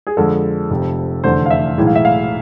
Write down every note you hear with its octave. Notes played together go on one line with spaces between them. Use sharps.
G#4
F2 D3 G#3 A4
F1 F2 C3
F1 E2 D3 A3 C5
F5
E5
B1 A2 E3 G#3
F5
E5
F5